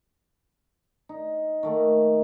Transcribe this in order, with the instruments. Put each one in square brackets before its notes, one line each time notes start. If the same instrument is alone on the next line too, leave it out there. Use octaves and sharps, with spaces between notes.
[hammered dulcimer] D#4
D#3 A3 A#3